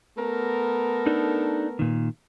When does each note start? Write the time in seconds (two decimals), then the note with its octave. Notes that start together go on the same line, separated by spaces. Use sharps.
0.16 A3 B3 A#4
1.06 D4 D#4 A4
1.79 A#2 D#3